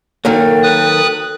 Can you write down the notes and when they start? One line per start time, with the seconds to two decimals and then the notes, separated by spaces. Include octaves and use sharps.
0.25 D#3 F#3 A#3 A4 G5
0.63 B4 D#6 F#6